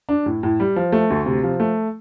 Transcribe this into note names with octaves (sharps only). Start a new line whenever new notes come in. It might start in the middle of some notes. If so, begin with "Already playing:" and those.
D4
A2
A2
G3
F3
A3
D2
C3
F3
A3